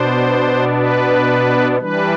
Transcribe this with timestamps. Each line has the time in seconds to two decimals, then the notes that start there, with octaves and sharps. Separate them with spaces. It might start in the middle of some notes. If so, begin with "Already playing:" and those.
Already playing: B2 B3 D4 C5
0.75 B4
1.78 E3 G3 D4 B4